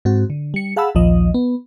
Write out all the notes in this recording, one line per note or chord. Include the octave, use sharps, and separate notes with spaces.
G#2 C4 F#4
D3
G3 C#7
G#4 F5 F#5 A5 B5 E6
A#1 D#2 F3 D#5
B3